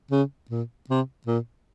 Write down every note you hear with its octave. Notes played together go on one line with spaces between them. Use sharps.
C#3
A#2
C3
A#2